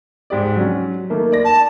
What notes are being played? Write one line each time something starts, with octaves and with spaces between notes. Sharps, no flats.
G#2 G4 D5
F#3 C#4
D#3 A3 A#3
D5 A#6
A5